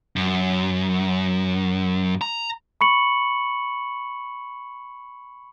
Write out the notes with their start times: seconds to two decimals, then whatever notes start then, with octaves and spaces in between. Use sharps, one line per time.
0.16 F#2
2.21 A#5
2.81 B5 C#6 C#7 F#7